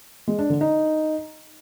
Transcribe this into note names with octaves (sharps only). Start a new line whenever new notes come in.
G#3
D4
D3
D#4